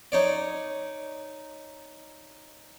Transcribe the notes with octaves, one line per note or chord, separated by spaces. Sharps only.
D#4 C#5 D5